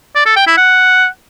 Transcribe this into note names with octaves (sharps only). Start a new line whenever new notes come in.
D5
A4
G5
E4
F#5